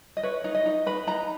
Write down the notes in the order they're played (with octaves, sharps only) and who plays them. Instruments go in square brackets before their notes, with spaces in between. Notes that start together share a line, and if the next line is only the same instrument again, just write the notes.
[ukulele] D#5
B4 C#5
D#4
D#5
D#4
B4 B5
D#4 A#5